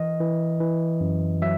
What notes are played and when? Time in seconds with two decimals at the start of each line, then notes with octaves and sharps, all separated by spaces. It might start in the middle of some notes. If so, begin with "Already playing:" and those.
Already playing: E3 D#5
0.20 E3
0.60 E3
1.01 F#2
1.42 F#3 E5